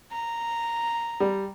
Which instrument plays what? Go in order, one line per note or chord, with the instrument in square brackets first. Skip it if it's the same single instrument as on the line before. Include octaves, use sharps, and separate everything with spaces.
[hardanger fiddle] A#5
[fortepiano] G3